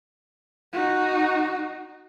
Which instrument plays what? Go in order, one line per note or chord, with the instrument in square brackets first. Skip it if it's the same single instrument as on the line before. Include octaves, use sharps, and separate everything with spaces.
[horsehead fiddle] D#4 F#4